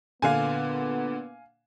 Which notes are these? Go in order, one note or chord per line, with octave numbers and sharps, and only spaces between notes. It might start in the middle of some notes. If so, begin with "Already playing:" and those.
A#2 D3 B3 F5 G#5